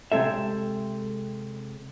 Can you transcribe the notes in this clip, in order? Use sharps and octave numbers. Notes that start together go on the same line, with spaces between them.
C3 G#3 C4 A4 E5